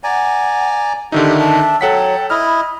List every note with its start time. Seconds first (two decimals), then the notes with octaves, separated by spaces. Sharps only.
0.04 D5 F#5 G#5 A#5
1.12 D3 D#3 D4 D#4 G4 E5
1.38 A5
1.81 F#3 A4 F#5 G5 B6
2.30 E4 D#5 B5 F6